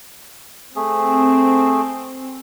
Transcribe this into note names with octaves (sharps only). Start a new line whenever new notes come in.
A3 C4 G#4